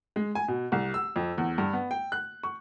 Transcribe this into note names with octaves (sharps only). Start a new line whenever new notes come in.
G#3
G#5
B2
C2
E6
F2
E2
G2
B3
G5
F#6
C#6